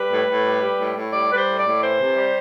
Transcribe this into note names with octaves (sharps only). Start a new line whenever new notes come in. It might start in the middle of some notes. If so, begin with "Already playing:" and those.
Already playing: G3 B4
A2
A2
G3
G3
A2
A2
G3 D5
G3 B4
C5
A2
D5
A2
E3 C5
C3
G3